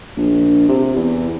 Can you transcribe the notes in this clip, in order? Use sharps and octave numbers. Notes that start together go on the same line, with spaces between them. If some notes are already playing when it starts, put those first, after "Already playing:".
A#1
C3
E2